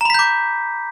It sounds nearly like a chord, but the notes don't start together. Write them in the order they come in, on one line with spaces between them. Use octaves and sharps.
A#5 B5 B6 G6 D6